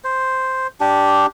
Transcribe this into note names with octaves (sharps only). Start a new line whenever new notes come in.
C5
D4 G4